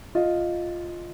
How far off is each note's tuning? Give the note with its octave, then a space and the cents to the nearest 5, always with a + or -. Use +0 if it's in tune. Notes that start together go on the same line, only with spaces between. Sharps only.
F4 +0 D#5 +0